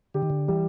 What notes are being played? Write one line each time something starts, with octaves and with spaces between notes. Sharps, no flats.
D3 G4
D#3
D3
E3 G3